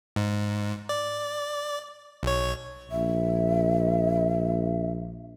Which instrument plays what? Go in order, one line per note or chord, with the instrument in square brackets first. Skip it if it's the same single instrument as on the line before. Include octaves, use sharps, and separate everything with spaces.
[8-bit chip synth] G#2
D5
B1 C#5
[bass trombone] A#1 [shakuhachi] E5